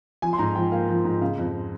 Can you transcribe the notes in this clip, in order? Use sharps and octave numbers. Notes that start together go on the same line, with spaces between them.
F3 G#5
C6
G#2 A#5
F3 G5
A#3 F5
F3
G#2
C#3 F5
F2